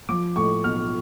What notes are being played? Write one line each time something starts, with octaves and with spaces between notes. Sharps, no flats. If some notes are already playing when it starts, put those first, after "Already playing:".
F3 D6
A2 C#6
B1 F6